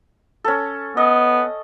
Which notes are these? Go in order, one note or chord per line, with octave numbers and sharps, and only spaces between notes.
C#4 A4
B3 D#5